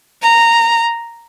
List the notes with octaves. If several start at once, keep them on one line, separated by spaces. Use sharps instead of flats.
A#5